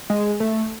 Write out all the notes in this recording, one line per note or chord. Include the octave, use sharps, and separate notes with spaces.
G#3
A3